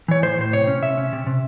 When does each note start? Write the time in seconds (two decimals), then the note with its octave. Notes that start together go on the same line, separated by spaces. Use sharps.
0.08 E3 C#5
0.22 A2 C5
0.38 A2 C5
0.53 C3 C#5
0.67 C#4
0.82 C3 E5
0.97 C#4
1.13 C3
1.27 C3